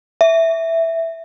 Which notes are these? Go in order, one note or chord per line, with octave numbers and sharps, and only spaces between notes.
E5